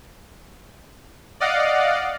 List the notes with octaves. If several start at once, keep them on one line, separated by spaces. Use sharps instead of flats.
D5 D#5 F5 F#5